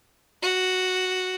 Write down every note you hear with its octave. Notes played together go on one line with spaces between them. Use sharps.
F#4